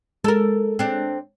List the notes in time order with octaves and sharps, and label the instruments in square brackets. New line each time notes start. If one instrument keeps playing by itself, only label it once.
[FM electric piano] G#3 [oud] A4 A#4
[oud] C4 D4